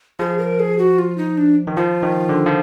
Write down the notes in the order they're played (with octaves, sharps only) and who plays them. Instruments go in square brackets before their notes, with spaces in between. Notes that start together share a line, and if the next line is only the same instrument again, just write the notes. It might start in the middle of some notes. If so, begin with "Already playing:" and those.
[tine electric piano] F3 [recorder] G#4
[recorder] A#4
G#4
F#4
F4
D#4
D4
[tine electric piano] D#3
[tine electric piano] F3 [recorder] F4
[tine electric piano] D#3
D3
F3